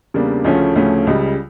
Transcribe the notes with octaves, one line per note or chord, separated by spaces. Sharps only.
E2 C#3 G3 A#3 D4
D2 C#3 F3 A3 C#4
D2 C#3 F3 A3 C#4
C#2 C#3 G3